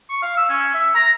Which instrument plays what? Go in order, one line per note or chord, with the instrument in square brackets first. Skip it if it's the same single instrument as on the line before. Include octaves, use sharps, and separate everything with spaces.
[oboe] C#6
F5
E6
C#4
E5
A#5